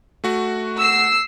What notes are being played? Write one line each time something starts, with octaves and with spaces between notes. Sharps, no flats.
A3 F#4 F#5
E6 C7